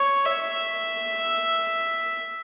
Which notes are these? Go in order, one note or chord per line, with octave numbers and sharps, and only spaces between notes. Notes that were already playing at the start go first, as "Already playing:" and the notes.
Already playing: C#5
E5